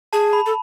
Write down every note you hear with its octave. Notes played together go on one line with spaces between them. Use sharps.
G#4 A5
B5
A4